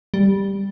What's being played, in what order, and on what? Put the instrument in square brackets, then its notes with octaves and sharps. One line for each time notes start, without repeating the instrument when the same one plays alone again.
[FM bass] G3